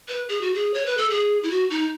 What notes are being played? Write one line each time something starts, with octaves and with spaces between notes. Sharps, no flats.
B4
G#4
F#4
G#4
C#5
B4
A4
G#4
E4
F#4
D#4